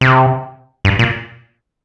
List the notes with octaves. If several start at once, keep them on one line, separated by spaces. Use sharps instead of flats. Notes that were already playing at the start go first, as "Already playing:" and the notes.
C3
G2
A#2